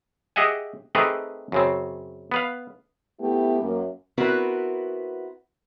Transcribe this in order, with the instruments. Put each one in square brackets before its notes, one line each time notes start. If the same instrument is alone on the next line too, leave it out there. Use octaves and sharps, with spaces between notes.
[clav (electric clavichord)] G4 G#4 D#5 E5 F#5 G#5
A3 C4 D#4 G4 G#4 B4
F#2 C#3 C4
B3 B4 F5
[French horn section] A3 B3 E4 G4
F#2 A#3
[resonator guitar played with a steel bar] B3 C4 E4 F#4 A#4 B4